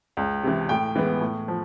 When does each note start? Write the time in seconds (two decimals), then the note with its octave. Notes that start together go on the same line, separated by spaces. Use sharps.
0.17 C#2
0.43 C3 E3
0.69 A2 G5
0.95 E3 G#3 B3
1.21 A2
1.48 F3